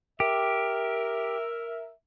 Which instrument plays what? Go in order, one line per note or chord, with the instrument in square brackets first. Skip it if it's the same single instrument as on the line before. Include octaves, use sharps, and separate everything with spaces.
[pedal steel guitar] G4 [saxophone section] A#4 E5